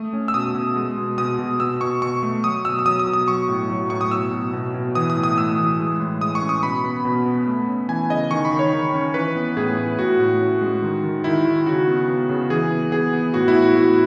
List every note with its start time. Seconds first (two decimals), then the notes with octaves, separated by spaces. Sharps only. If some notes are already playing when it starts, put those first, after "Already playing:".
Already playing: A3 D#6
0.13 C#4
0.28 E6
0.34 B2 D#6
0.55 B2
0.76 G#3
0.97 B2
1.18 B2 D#6
1.39 B2
1.60 B2 E6
1.81 B2 C#6
2.02 B2 C#6
2.23 A3
2.44 F#3 D#6
2.65 B2 E6
2.79 E6
2.86 F#3 D#6
2.99 D#6
3.07 B2
3.13 D#6
3.28 F#3 C#6
3.49 A2
3.70 F#3
3.90 A2 C#6
4.01 D#6
4.11 B2 E6
4.32 B2
4.53 B2
4.74 B2
4.95 E3 D#6
5.10 D#6
5.16 A2
5.23 D#6
5.37 A3 E6
5.58 E3
5.79 G#3
6.00 A2
6.21 G#3 D#6
6.35 C#6
6.42 C#4
6.49 D#6
6.63 B2 B5
6.84 B3
7.05 B2
7.26 B3
7.47 A3
7.68 C#4
7.89 E3 G#5
8.10 C#3 D#5
8.31 D#3 C#6
8.45 B5
8.52 D#3
8.59 C#5
8.73 D#3
8.94 C#4
9.14 E3 B4
9.36 B3
9.57 A2 G#4
9.78 A2
9.98 A2 F#4
10.20 A2
10.41 C#4
10.62 G#3
10.82 D#3
11.03 D#3
11.24 D#3 E4
11.45 D#3
11.66 C#3 F#4
11.87 B3
12.08 B3
12.29 C#3
12.50 E3 G#4
12.71 B3
12.92 B3 G#4
13.13 B3
13.34 A2 F#4
13.48 E4
13.55 A2
13.62 F#4
13.76 A2 F#4